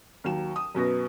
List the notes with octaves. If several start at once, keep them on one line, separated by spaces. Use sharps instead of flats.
D#2 F#3 E7
D#6
F#2 B2 B3 A#6